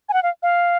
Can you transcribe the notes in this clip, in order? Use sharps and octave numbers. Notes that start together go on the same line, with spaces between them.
G#5
F#5
F5
F5